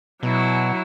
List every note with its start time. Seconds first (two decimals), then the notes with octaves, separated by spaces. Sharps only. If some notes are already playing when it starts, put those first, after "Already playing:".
0.23 B2 F#3 E4